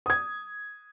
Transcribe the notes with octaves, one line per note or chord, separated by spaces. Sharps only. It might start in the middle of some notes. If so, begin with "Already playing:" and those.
D#6 G#6